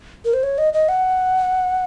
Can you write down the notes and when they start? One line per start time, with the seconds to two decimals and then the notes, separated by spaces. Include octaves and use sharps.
0.25 A#4
0.34 C5
0.43 C#5
0.58 D#5
0.73 D#5
0.89 F#5